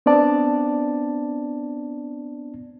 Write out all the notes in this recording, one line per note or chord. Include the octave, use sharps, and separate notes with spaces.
B3 C4 D4 D5 A5